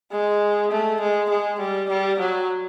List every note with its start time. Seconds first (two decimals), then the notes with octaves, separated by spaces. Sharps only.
0.12 G#3
0.71 A3
1.01 G#3
1.30 G#3
1.60 G3
1.90 G3
2.19 F#3